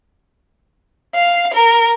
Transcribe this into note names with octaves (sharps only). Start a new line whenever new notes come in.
F5
A#4